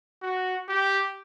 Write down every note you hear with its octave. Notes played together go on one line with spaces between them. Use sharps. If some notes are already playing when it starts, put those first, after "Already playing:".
F#4
G4